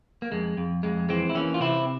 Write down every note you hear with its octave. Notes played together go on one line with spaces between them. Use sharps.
A#3
F2 G#3
F2
F2 G#3
E3 G#3 C4
E4
E3 A#3 C#4
F4
C3 C4 E4